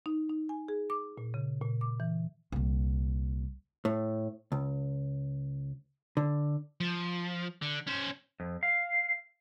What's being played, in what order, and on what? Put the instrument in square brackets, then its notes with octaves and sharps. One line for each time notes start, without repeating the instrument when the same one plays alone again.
[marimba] D#4
D#4
G#5
G#4
D6
A#2
C#3
A#2
D6
E3
[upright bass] C2 A#2
[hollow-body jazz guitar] A2
C#2
D3
[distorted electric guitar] F3
D3
C#4 C5
[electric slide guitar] F2
F5